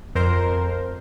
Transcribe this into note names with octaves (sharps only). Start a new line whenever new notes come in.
F2 A#4 C5